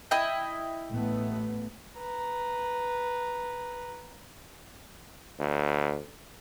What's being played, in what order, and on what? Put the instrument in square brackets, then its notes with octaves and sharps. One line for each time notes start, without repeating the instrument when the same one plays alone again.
[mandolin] E4 D#5 G5
[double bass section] A1 A3 B3
[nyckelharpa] B4 A#5
[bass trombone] D2